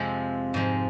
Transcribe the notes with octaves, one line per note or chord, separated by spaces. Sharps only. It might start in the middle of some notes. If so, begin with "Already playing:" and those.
Already playing: F2 C3 F3 G#3
G#2 F3 G#3